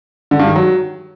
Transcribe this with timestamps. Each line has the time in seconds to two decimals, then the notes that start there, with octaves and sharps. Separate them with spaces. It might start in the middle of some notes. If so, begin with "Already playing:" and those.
0.31 D3
0.39 G2
0.47 D#3
0.56 F#3